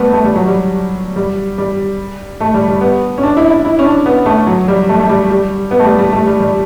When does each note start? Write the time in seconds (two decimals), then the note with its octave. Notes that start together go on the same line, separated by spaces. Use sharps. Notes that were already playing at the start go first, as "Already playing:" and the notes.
Already playing: G3 A3 B3
0.13 A3
0.24 G3
0.36 F#3
0.46 G3
1.16 G3
1.58 G3
2.41 A3
2.54 G3
2.68 G3
2.81 B3
3.18 C#4
3.23 D4
3.37 E4
3.50 E4
3.65 E4
3.79 C#4
3.85 D4
4.06 B3
4.26 A3
4.47 F#3
4.68 G3
4.89 A3
4.99 A3
5.09 G3
5.30 G3
5.71 B3
5.79 A3
5.85 G3
5.98 G3
6.12 A3
6.27 G3
6.40 G3